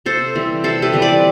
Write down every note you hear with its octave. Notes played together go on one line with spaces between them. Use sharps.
C3 A4 C5
E3 G3 C4
C3 A4 C5
G4 B4
E3 G3 C4
B4 D5